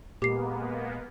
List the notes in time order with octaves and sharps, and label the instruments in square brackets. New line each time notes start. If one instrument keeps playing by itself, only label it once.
[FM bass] A#2 [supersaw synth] G#3 A#3 B3 [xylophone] G4 C7